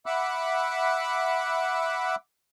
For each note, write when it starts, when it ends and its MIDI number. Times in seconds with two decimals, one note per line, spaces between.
0.06 2.15 76
0.06 2.15 78
0.06 2.15 83
0.06 2.15 86
0.06 2.15 88
0.06 2.15 90